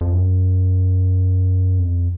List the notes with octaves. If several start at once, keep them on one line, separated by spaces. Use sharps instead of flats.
F2
F#2
F2